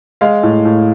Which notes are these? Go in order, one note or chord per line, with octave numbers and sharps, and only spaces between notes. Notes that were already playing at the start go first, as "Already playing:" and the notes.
G#3 F5
A2
A2